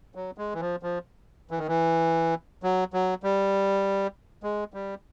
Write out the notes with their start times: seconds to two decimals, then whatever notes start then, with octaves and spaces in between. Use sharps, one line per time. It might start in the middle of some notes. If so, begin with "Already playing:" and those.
0.15 F#3
0.38 G#3
0.54 E3
0.60 F3
0.83 F3
1.51 E3
1.59 D#3
1.68 E3
2.63 F#3
2.93 F#3
3.23 G3
4.43 G#3
4.74 G3